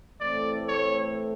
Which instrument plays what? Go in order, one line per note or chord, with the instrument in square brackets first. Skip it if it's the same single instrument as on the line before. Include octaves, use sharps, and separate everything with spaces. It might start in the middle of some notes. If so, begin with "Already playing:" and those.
[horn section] A2 E3 A3 C4 D5
C#5